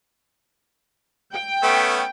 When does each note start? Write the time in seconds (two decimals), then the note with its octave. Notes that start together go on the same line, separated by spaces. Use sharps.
1.32 G5
1.63 A3 B3 C#4